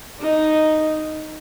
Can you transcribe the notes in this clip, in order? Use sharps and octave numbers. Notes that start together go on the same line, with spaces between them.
D#4